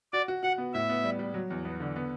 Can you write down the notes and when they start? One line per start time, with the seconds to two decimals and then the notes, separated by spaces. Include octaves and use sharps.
0.13 F#4 D5
0.28 F#4
0.43 F#4 F#5
0.58 B3
0.74 A2 E5
0.89 B3
1.04 G3
1.19 G3
1.34 F#3
1.50 E2
1.65 B3
1.80 D3
1.96 B3